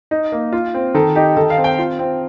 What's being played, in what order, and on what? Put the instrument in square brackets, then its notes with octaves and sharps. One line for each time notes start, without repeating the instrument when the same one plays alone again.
[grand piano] D#4
A#3
F4
C4
D#3 A4
D#4 G4
D#3 A4
F5
C4
G5
F4
C4